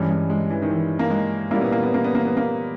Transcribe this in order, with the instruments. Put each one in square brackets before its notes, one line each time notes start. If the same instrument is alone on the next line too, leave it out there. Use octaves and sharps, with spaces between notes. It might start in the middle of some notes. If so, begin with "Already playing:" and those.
Already playing: [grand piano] G2 E3 G3 C#4 [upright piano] G#3
[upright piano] G#3
G#3
E3
D#3
E3
A#3
G#3
[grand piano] A#2 G3 C#4 E4 [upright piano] A#3
[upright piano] B3
A#3
B3
A#3
B3
A#3
B3
A#3